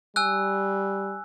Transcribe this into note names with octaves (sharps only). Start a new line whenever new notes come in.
G3 G#5 E6 F#6